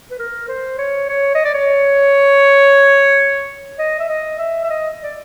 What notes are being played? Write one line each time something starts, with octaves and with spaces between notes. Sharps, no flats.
B4
A#4
C5
C#5
C#5
D#5
D5
C#5
D#5
E5
D#5
E5
E5
D#5
D5